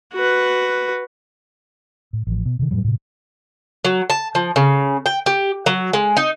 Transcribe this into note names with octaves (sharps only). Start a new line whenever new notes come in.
F#4 B4
A2
A1 F3
B2
C3 D#3
F#2 A2 F#3 G3
A2 C3
F#3
A5
F3
C#3
G5
G4
F#3
G#3
D#4